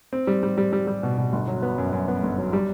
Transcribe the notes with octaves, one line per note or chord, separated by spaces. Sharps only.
C4
G3
G3
G3
G3
G3
B2
B2
G1
F#3
B3
F#2
F#2
B3
G1
F#3
G3